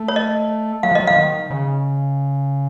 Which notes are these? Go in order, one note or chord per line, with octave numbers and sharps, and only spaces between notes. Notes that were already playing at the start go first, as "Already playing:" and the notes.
Already playing: A3
C#5
D#5
F#3 F5
F3
F#3 D#5
F3 F5
D#3
C#3